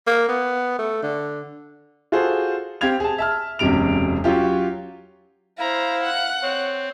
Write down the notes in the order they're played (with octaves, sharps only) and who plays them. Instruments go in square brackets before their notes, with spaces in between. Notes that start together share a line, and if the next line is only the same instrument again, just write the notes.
[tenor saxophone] A#3
B3
A3
D3
[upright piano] F4 F#4 G#4 A4 C5
C4 G4 F5 G#6 F7
G#4 A5
E5 A5 F6
E1 B1 F#2 C3 D7 F7
F#3 C#4 F4 G4
[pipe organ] E4 [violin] C5 A#5 [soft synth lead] F5
[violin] F#5 F#6
[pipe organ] C4 [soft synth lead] C#5